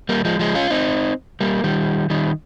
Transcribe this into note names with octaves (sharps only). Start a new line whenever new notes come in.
G3 A#3
F3 G#3
F3 G#3
C#4 F4
C4 D#4
G3 A#3
D#3 G3
D#3 G3